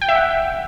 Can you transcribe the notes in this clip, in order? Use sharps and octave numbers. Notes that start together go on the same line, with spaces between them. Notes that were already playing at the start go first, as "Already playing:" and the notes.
G5
E5
F#5